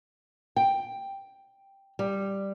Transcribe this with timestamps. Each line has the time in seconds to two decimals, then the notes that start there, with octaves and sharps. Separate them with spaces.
0.56 G5
1.99 G3